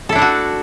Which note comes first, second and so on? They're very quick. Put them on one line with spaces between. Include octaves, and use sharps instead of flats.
A4 E4 D4 A3 F#4